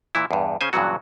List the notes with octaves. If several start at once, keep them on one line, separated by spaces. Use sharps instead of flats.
A#2 E3 E4
E2 G2
C#3 C#4 C5 G#5
G2 A#2 C#3 E3 F#3 F#4